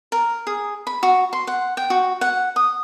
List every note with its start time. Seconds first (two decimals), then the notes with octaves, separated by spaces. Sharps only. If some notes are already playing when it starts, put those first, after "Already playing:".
0.12 A#4
0.47 G#4
0.87 B5
1.03 F#4
1.33 C6
1.47 F#5
1.77 G5
1.90 F#4
2.21 F#5
2.56 D#6